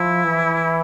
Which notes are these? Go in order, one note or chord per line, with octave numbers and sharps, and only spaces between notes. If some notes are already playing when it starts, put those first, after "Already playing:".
Already playing: F3 E4
E3